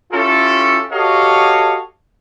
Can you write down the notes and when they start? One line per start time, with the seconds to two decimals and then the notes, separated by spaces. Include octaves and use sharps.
0.12 C#4 E4 F4 G4 A4
0.92 F#4 G4 A4 C#5 D#5 F5